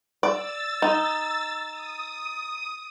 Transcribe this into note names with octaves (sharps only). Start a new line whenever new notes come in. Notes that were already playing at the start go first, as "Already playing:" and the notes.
D5 E6 A6
D#4
D#6